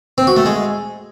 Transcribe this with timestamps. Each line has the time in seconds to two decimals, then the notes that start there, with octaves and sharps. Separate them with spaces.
0.18 C4
0.27 F#4
0.37 A3
0.46 G#3